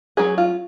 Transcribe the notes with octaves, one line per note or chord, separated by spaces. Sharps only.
F#3 C#4 G#4
F4